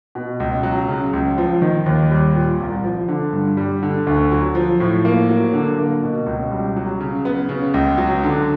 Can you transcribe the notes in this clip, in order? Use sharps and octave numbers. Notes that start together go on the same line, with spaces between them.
B2
C#2
F#3
C#3
C#2
F3
D#3
D#2
G3
A#2
C2
F3
D3
G2
G3
D3
D2
F#3
F3
A2
A#3
F#3
D3
A#3
B2
C#2
G3
F#3
C#3
B3
C#3
C#2
F#3
D3